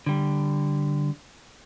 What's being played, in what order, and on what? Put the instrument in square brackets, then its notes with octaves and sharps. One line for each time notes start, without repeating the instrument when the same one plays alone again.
[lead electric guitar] D3 G3